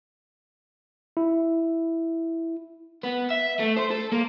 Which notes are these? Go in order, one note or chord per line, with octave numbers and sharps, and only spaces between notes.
E4
B3
E5
A3
C5
A4
A#3